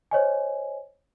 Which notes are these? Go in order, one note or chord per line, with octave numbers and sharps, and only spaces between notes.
C5 C#5 D#5 G#5